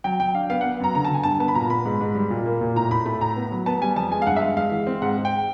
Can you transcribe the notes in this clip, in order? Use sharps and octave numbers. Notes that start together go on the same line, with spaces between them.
F#3 G5
F#3 G5
D4 F5
B3 F5
F#5
B3
F#2 A#5
D3 A#5
A5
D3 G#5
G2 A5
B3 A5
B5
A#2 A#5
B3 B5
G#2
G#2
G3
A#2
A#3
A#2
A2 A#5
A2 B5
A3 B5
A2 A#5
B3
F#3
B3 A5
G3 G#5
F2 A5
G#3 G#5
F5
G2 F#5
E5
G#3 F5
G#3 F5
E3
C4
G#2 F#5
G#2
G5